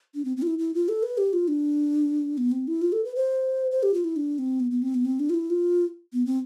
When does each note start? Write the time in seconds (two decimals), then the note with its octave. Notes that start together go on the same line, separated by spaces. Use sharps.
0.15 D4
0.25 C4
0.37 C4
0.42 F4
0.47 E4
0.59 E4
0.74 F4
0.89 A4
1.03 B4
1.18 G4
1.33 F4
1.48 D4
2.38 B3
2.52 C4
2.68 E4
2.82 F4
2.92 A4
3.05 B4
3.15 C5
3.71 C5
3.83 G4
3.94 F4
4.04 E4
4.16 D4
4.39 C4
4.60 B3
4.71 B3
4.82 C4
4.94 B3
5.05 C4
5.20 D4
5.30 F4
5.34 E4
5.50 F4
6.13 B3
6.26 C4